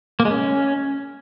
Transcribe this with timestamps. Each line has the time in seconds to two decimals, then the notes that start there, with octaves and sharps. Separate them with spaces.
0.20 A#3
0.25 G#3
0.31 C#4